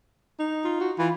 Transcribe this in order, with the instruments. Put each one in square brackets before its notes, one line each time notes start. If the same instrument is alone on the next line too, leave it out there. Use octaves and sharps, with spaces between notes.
[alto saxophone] D#4
[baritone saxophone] F4
[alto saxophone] F#4
[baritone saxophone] E3 [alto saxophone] F4